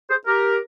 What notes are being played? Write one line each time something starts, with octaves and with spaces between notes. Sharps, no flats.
G#4 C5
G4 A#4